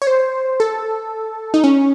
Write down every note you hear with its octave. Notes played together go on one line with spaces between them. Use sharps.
C#5
C5
A4
D#4
C#4